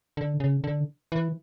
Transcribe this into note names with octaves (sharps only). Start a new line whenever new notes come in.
D3
C#3
D3
E3